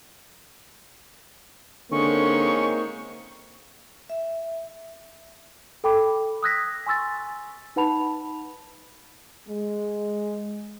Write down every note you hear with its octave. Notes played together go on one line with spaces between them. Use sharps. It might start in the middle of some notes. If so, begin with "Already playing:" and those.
D3 G#3 A#3 C4 C#4 D#4 C#6
E5
A4 G5 B5 D6
D#6 E6 F#6 G#6 A#6 B6
G#5 C6 C#6 E6 A6
D#4 B4 F#5 A5 B5 F7
G#3